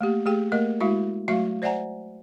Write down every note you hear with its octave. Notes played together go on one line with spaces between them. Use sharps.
A3 A#3 G4
A3 G4 G#4 G5
A3 A#3 A#4 D#5
G#3 E4 F#4 F5
F#3 A3 F#4 E5 F5
C5 D5 E5 F#5 G#5 A#5